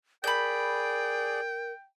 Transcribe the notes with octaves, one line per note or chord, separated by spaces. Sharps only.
G#4 A#4 D5 G5 B5 G6